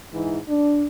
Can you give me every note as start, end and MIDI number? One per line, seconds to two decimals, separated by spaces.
0.13 0.38 44
0.13 0.38 52
0.49 0.88 62